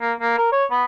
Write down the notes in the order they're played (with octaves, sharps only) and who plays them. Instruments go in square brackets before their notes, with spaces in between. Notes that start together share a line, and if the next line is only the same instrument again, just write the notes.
[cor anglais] A#3
A#3
A#4
C#5
B3